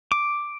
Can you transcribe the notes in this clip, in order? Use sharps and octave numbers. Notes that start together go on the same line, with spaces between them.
D6